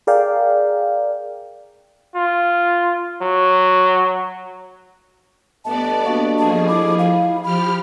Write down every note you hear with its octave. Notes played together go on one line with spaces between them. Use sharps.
G#4 A#4 D5 F5 G5
F4
F#3
G2 A3 B3 D5 D#5 A5
A#3 D4 F#4
F3 G#4 A5
E4 D6
F5
F3 G4 B5 F6